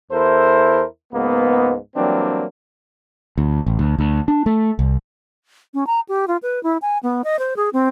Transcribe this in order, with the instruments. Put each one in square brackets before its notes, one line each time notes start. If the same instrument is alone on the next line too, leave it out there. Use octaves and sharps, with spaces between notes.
[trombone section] E2 E4 A4 A#4 C5
C#2 G#2 A#3 B3
E3 F#3 G3 A#3 C4 D4
[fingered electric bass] D2
A1
D2
D2
D4
A3
C2
[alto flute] C#4
A#5
G4
F4
B4
E4
G#5
B3
D#5
C5
G#4
C4